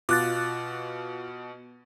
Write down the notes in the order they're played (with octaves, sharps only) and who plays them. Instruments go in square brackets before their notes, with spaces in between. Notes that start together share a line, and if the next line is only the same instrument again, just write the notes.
[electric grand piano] B2 [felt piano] F4 [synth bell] D6 F#6 A6